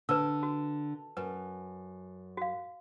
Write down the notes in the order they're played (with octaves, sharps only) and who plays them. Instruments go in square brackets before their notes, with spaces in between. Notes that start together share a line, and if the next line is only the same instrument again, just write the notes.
[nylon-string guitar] D3 [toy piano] B4 E6
[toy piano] F#4
[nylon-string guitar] F#2 [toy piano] B4
[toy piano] F#4 F5